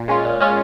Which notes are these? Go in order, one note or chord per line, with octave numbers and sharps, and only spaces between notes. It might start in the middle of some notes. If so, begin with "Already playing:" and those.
Already playing: A#2
G#3 C#4 F4
A#2
G#3 C#4 F4